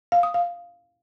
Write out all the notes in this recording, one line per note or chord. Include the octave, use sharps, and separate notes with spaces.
F5
D#6
F5